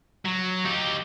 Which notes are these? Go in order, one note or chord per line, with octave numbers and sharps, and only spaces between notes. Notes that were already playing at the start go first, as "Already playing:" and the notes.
F#3
D#4 G4